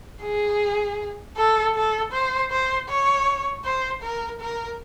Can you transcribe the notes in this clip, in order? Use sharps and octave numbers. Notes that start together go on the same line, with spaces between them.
G#4
A4
A4
C5
C5
C#5
C5
A#4
A#4